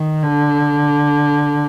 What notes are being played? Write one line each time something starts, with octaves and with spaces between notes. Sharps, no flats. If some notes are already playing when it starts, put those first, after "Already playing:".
Already playing: D#3
D3